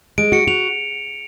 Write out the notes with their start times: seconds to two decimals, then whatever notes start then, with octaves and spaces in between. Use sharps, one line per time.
0.18 G#3 D7
0.32 F#4 C#7
0.47 F#4 F7